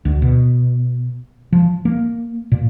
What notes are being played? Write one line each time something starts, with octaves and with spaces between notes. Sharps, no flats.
D2
B2
F3
A#3
A#2